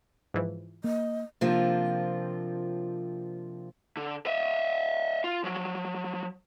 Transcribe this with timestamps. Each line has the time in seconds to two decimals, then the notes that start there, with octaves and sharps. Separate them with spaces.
0.34 G#2 E3 F3
0.84 A#3 D#5
1.41 C3 F3 A#3 C4 D4 F4
3.97 D3
4.26 D#5 E5
5.24 F4
5.44 F3 F#3